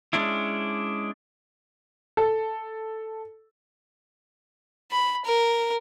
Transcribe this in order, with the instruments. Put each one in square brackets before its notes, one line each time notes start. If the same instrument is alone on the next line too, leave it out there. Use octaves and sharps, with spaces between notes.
[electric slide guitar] G#3 C#4 D4 E4
[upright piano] A4
[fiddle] B5
A#4